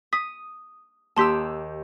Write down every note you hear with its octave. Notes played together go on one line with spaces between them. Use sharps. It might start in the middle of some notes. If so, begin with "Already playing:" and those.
D#6 B6
D#2 G4 A5 C6 E6 B6